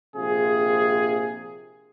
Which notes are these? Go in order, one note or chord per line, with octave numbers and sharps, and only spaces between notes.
A#1 C3 F4 G#4